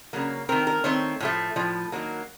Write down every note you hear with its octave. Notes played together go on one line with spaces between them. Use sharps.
C#3 F#3 A#3
D#3 A3 C4 A#4
A#4
D#3 A3 C4 C#5
A2 F3 A3
A2 F3
D#3 F#3 A#3